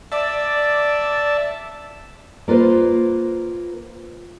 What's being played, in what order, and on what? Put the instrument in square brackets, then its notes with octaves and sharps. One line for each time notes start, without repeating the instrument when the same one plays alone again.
[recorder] D5 [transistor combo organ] E5 A5
[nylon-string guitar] A#3 F4 B4 C5